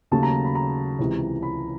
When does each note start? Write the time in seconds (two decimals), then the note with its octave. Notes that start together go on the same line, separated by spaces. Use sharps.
0.11 D#2 C#3 F#3 A3 A5
0.23 A#5
0.44 B5
0.55 A#5
0.99 C#2 C3 E3
1.43 B5